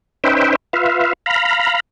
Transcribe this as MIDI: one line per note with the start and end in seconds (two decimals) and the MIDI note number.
0.24 0.56 61
0.24 0.56 63
0.24 0.56 71
0.24 0.56 72
0.24 0.56 76
0.24 0.56 79
0.73 1.13 65
0.73 1.13 71
0.73 1.13 76
0.73 1.13 77
1.26 1.80 77
1.26 1.80 82
1.26 1.80 83